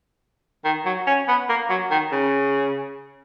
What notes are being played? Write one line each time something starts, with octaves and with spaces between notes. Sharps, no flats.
D#3
F#3
C#4
B3
A#3
F#3
D#3
C#3